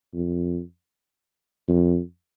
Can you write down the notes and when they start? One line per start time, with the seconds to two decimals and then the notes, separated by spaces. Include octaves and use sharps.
0.14 F2
1.68 F2